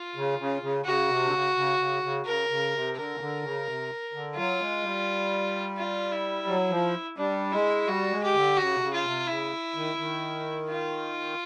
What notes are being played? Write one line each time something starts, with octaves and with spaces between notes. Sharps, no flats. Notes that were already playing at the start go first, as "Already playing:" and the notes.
Already playing: F4
C#3
C#3
C#3
C#3 F#4
C3
D3
C#3
C#3
C#3
C#3
C#3 A#4
C#3
C3
D3 A#4
C#3
D3
C#3
C3
D3
F#3 F4
G#3
G3
F4
E4
F#3
F3
G3 D4
G#3 E4
G3 F#4
G#3
G4
D3
C#3 F#4
C3
C#3
F4
C3
C#3 E4
D#3
D#3
F4